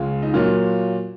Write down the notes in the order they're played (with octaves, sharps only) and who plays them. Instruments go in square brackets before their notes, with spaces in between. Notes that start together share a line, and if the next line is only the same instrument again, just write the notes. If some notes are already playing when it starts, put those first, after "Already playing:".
Already playing: [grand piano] C#2 C#3 G#3 F4
D#4
A#2 F#3 A#3 F4